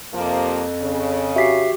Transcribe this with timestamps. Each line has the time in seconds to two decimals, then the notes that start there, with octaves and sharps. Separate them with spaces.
0.14 F2 C3 F3 A#3
0.81 C#3
1.36 F#4 G4 E5 B6 C7